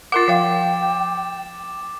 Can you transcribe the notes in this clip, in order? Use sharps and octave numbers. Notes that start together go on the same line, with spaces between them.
F4 A#4 F#5 D6 A6
F3 F5 G5